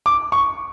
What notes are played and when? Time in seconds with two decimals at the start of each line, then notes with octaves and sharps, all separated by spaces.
0.06 D6
0.32 C#6